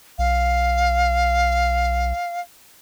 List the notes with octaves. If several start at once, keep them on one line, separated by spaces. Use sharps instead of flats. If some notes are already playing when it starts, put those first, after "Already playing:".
B1 F5